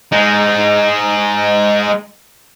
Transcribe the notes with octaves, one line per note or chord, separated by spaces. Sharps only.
G#3 D#4